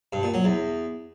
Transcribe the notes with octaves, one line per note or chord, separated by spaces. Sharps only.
G2
A#2
F#3
E2